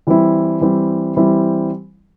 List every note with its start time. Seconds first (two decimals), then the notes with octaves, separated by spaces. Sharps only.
0.07 E3 G3 C4 E4
0.61 E3 G3 C4 E4
1.16 E3 G3 C4 E4